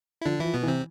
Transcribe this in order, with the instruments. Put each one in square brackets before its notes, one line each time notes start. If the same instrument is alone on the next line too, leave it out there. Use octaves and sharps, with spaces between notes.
[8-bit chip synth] E4
[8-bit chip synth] D3 D4 [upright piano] F3
[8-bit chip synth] E3 E4 [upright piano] F3
[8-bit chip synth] B2 B3
[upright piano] E3
[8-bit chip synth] C3 C4